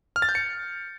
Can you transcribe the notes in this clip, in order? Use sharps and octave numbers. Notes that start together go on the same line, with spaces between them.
F6
A6
G6
C#7